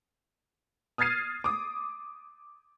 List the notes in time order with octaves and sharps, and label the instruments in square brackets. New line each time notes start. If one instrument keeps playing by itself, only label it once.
[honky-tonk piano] D#6 F6 G#6 A6 C7 D#7
D6 D#6